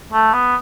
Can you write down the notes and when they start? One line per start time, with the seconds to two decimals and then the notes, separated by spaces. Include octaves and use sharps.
0.12 A3
0.33 B3